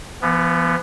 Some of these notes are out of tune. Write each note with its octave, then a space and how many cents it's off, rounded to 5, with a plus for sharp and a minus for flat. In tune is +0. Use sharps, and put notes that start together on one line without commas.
F3 -45 B3 +0